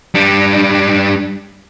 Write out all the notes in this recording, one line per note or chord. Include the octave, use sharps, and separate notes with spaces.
G3 D4